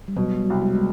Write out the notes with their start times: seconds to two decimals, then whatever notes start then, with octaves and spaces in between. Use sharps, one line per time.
0.08 G3
0.16 B2 F#3
0.40 G3
0.50 C2
0.62 G#3
0.75 G#3